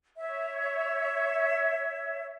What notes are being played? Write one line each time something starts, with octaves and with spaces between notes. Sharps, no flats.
C#5 E5